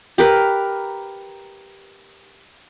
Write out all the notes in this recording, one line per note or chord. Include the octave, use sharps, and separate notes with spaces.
G4 A#4 B4